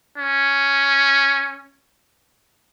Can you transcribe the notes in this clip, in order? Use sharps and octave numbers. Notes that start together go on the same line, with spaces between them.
C#4